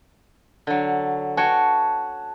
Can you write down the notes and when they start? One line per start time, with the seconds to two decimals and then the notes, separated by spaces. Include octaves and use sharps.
0.67 D3 F#3
1.37 F#4 C#5 G5 A5